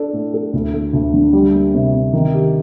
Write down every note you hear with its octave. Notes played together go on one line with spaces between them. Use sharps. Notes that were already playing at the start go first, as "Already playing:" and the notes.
Already playing: D4 A4
A2
A4
D2
A3
D2
D3
G3
A#3
C3
C3
D#3
G4